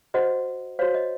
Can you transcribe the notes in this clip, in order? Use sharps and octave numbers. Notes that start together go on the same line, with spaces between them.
F#4 C5 D#5 F#5
F#4 C5 C#5 F5
D#5